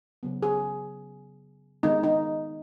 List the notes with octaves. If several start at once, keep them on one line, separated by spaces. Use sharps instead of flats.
C#3 F#3 B3
G#4
D#3 G#3 B3 D#4
D#4